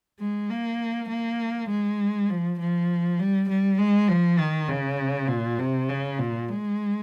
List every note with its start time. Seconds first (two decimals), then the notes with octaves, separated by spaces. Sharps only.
0.19 G#3
0.50 A#3
1.09 A#3
1.69 G#3
2.30 F3
2.59 F3
3.19 G3
3.49 G3
3.79 G#3
4.08 F3
4.39 D#3
4.68 C#3
5.28 A#2
5.59 C3
5.89 C#3
6.19 A#2
6.49 G#3